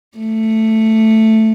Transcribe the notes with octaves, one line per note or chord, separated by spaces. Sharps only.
A3